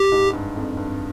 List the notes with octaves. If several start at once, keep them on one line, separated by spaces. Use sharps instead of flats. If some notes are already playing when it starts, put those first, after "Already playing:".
Already playing: G4
G#2
G2
F2
G2